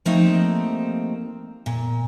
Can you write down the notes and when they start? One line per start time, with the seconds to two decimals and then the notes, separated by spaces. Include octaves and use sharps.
0.06 F3 A3 A#3 C4 D#4 G4
1.66 A#2